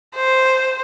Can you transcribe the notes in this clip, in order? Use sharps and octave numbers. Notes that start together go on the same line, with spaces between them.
C5